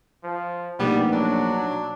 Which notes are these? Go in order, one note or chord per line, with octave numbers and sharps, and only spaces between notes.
F3
A#1 B2 G3 A3 B3 D#4
F#3 D4